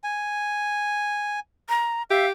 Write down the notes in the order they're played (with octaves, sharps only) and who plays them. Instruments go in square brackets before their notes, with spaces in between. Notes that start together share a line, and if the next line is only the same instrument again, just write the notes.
[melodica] G#5
[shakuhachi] A#5
[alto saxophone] G4 [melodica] E5 [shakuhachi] F5